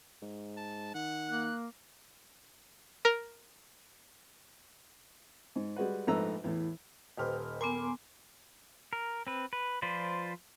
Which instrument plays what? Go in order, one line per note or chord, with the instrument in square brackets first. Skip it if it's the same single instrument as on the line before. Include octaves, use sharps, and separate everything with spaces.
[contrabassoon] G#2
[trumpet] A5
[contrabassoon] D#3 [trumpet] F#5
[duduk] A#3 [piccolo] F#6
[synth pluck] A#4
[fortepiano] G#2
G3 G#3 F#4 B4
A#1 G#2 A3 B4 A#5 E6
E2 A2
[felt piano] D#1 G4 F6 [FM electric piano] B4 C5 D#5
[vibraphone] B3 G#5 [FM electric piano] A#4 C6 D6
[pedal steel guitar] A#4
C4 B4
B4
F3 F4 B4 C5 D5